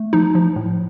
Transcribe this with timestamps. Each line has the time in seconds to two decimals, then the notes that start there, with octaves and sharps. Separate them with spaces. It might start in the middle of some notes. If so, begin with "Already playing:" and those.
Already playing: A3
0.13 F3 D#4
0.35 F3
0.56 A2